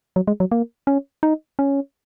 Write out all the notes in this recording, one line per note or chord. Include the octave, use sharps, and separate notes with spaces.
F#3
G#3
F#3
A#3
C#4
D#4
C#4